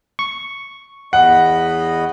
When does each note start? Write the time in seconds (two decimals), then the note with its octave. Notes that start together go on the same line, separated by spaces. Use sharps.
0.19 C#6
1.13 E2 D#5 F#5 B5